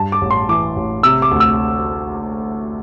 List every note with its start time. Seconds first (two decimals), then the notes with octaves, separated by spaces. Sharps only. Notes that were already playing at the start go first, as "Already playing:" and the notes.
Already playing: G2 A5
0.12 D6
0.21 A1
0.31 C6
0.49 E3 D6
0.76 A1
1.03 C3 E6
1.22 D6
1.31 D2
1.40 E6